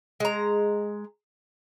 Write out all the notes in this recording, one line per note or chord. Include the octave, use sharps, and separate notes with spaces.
G#3 A#5